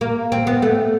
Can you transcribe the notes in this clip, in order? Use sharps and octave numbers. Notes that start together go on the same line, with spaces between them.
A#3
C4
B3
A3